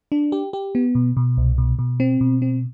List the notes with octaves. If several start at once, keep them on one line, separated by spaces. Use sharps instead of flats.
D4
G4
G4
B3
B2
B2
C2
B2
B2
C4
B2
C4